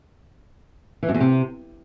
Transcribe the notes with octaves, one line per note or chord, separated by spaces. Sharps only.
E3
F#2
E2
C3